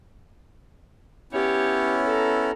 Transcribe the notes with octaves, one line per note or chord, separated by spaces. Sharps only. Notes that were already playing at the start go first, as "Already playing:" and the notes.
B3 C#4 E4 G4 C#5
A4 A#5